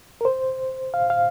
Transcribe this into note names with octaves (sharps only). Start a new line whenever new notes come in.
A#4
C5
F5
F5